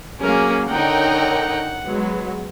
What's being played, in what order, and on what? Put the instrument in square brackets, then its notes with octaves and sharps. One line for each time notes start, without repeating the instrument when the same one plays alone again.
[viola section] F#3 A#3 [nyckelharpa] C#4 A#4 [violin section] G#4
[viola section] D3 D#4 G5 [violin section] A#4 C#5 [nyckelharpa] F#5
[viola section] F#3 G#3 [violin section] B3